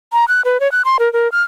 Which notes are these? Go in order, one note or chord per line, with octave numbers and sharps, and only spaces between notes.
A#5
F#6
B4
C#5
F#6
C6
A#4
A#4
F6